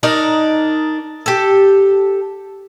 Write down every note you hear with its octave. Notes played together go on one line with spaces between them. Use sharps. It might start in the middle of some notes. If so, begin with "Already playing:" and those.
D4 D#4 A#4 D5
G4 A4